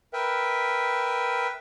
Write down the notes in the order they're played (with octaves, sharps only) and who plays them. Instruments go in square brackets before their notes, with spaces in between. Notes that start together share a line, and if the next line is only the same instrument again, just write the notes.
[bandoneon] A#4 B4 E5 G5